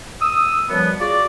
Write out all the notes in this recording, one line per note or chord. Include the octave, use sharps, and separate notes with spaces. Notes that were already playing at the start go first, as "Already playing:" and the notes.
D#6 E6
F#2 F3 G3 B3
F4 F#4 G#4 D5